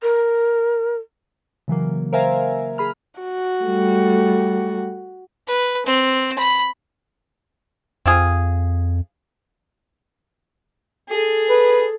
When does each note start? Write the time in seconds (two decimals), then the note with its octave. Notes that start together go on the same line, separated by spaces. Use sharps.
0.02 A#4
1.68 C#3 E3 F#3 A#3
2.13 A#4 C5 E5 F5 G#5 A#5
2.78 G#4 B5 F6
3.21 F#4
3.63 G3 A3
5.47 B4
5.86 C4
6.39 B5
8.06 F2 C4 F4 G#4
11.09 G#4 A4
11.49 B4